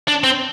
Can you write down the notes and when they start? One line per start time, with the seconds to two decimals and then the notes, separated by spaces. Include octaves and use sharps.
0.08 D4
0.24 C4